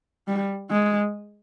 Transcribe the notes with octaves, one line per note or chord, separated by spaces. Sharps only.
G3
G#3